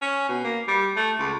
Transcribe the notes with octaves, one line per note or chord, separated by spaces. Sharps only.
C#4
B2
A#3
G3
A3
C#2